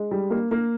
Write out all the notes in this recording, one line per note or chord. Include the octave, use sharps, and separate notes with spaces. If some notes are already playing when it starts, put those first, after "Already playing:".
Already playing: G#3
G3
A#3
A#3